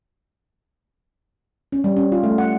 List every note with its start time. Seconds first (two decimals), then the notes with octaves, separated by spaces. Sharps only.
1.72 C#4
1.84 G3
1.97 C#4
2.12 F4
2.23 A3
2.38 F#5